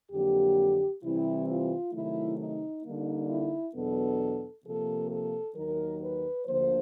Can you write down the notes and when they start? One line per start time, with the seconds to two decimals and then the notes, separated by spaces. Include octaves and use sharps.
0.12 F2 D3 F#3 A#3 G4
1.02 C3 E3 G3 C4 E4
1.47 F4
1.93 C3 D#3 F#3 A3 E4
2.38 D#4
2.83 D3 G3 A#3 D#4
3.29 E4
3.73 E2 B2 F#3 B3 D4 A4
4.65 C3 F3 A#3 A4
5.09 A4
5.55 D#2 D#3 F#3 A#4
6.01 B4
6.45 D2 D3 F3 A#3 C5